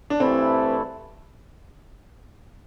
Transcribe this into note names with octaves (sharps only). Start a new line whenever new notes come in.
D4
G2 E3 A3 C4 E4 A4